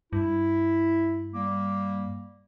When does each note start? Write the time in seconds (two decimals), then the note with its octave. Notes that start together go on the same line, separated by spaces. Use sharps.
0.13 G2 E4
1.34 G3 A#3